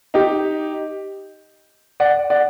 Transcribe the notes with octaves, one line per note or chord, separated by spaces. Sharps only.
D#4 G4
D5 F#5
D5 F#5